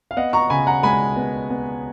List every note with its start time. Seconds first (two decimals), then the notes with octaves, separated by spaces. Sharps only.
0.11 F5
0.16 B3 D#5 F#5
0.33 A#5 C#6
0.50 C#3 G#5 B5
0.67 F#5 A#5
0.83 G#3 G#5 B5
1.17 B3
1.51 B3